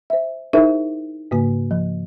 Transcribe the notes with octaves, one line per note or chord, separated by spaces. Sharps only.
C5 E5
D#4 E4 G#4 A#4 C5 E5
G#2 C#3 A#3
F3